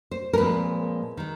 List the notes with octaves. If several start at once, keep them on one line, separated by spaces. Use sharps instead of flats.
C5
A#4
A#2 F3 G#3 C4 B4
D#3 G#3